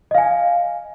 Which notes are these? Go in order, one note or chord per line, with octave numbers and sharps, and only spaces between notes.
D#5 F5 G#5